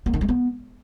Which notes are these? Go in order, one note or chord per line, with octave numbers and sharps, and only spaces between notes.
A#3
D#3
G#3
B3